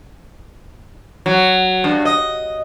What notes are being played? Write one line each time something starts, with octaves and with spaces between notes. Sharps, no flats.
F#3
G2
D#5